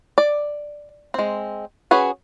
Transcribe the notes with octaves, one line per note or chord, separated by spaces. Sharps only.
D5
G#3 C4
C#4 F#4 G#4 B4